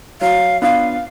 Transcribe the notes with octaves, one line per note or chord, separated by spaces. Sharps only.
F#3 F5
B3 D4 F4 F5